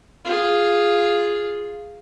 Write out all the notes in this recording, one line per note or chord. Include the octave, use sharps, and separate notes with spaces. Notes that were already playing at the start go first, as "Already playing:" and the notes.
F4 G#4